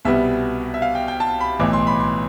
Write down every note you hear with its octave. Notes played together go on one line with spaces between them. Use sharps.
C2 B2 G3 B3 E5
E5
F5
G5
G5
A5
B5
B1 A2 E3 D6
C6
B5
C6